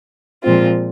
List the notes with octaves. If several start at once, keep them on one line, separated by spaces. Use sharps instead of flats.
A#2 F3 G#3 C4 F4